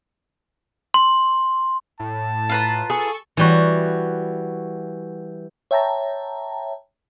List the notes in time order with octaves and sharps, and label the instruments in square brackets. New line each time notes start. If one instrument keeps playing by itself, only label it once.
[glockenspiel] C6
[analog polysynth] A2 [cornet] A5
[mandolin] F4 B4 A#5
[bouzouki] G#4 [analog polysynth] A4 C#6
[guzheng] E3 G3 F#4
[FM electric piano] C#5 E5 G5 A5 A#5